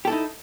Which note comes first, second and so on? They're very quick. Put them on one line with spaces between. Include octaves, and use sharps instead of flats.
G4 A4 E4 D#4